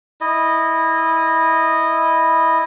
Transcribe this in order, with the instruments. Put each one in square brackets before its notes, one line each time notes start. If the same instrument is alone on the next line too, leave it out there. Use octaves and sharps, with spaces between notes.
[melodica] E4 D#5